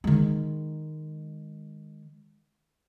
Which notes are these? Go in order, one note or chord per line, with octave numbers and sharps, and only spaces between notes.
D#3 G#3